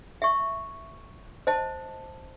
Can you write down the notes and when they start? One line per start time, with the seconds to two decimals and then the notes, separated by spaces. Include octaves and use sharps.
0.22 E5 C#6
1.47 C5 D#5 A5